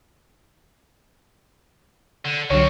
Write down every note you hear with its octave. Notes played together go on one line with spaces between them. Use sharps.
D3
C2 D3 D#3 F#3 C4 C#5